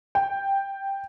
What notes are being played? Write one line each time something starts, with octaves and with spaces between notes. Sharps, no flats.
G5